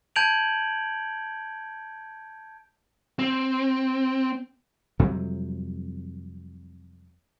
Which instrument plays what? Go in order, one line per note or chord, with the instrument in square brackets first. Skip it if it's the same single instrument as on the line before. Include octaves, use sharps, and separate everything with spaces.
[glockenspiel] A5 G6 G#6 D7 F7 F#7
[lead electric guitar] C4
[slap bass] F2 C3 F#3 G3